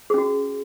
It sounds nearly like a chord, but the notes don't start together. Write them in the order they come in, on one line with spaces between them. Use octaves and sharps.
G#4 C#4 F#4